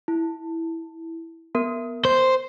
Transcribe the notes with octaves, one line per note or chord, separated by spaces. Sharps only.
E4
B3 A#4
C5